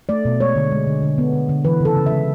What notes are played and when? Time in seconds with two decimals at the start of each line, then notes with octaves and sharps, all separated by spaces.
0.09 A3 D5
0.25 B2
0.40 G#3 C#5
0.56 D3
0.71 G#3
0.87 D3
1.02 D3
1.18 B3
1.33 D3
1.49 D3
1.65 E3 B4
1.80 C#3 A4
1.96 C#3
2.06 E5
2.11 G#3